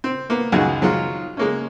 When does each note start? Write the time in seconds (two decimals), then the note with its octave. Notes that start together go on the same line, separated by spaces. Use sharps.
0.04 C4
0.30 A#3 B3
0.52 C#2 F#2 D#3 F#4 G#4 D#5
0.81 D#3 F#3 G#3 F4
1.37 G#3 A#3 C#4